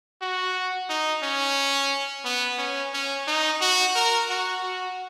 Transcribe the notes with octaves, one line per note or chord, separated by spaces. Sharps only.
F#4
D#4
C#4
B3
C#4
C#4
D#4
F#4
A#4
F#4
F#4